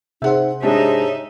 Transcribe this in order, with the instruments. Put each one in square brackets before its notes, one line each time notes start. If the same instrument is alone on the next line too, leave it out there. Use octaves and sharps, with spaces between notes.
[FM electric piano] C3 G#4 C5 [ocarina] D#4 [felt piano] E5 F#5
[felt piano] G#3 D4 G4 [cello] D#4 E5 [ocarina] C#5